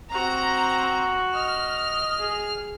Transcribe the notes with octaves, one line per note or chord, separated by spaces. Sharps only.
C4 F#4 A#5
D#5 F6
G#4